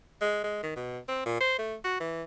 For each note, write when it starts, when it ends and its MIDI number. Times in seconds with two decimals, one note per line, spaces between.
0.21 0.42 56
0.44 0.63 56
0.63 0.72 51
0.76 0.98 47
1.08 1.24 60
1.26 1.38 46
1.40 1.57 72
1.59 1.75 57
1.84 1.96 66
2.00 2.23 52